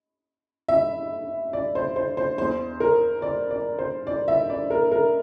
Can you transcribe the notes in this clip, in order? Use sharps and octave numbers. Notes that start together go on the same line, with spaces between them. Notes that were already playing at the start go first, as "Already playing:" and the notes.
E5
D5
C5
C5
C5
E2 E3 C5
A#4
D5
D5
C5
D5
E5
D5
A#4
A#4